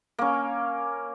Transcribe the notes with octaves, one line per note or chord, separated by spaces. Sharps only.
A#3 C#4